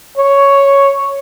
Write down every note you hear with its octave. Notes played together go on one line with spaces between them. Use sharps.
C#5